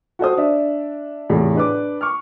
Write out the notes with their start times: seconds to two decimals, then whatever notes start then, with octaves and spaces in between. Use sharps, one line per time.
0.19 F#4 A4 C5 D#6
0.37 D4 D5 E5
1.30 E2 A2 C3
1.55 D4 B4 D6
2.01 C#6 D6 F6